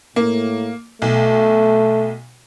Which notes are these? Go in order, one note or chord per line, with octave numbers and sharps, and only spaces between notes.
A2 A#3
B1 A3